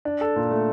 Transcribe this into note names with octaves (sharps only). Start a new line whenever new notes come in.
D4
A4
A#2
A3